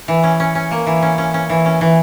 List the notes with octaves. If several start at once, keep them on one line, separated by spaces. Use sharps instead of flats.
E3
C#4
C#4
C#4
A#3
E3
C#4
C#4
C#4
E3
C#4
E3